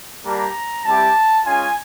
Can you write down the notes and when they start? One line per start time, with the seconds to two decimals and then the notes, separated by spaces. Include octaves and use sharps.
0.24 G3 A#3 D4 G4 A#5
0.85 G3 C4 E4 G4 A5
1.45 G#3 C#4 F4 G#5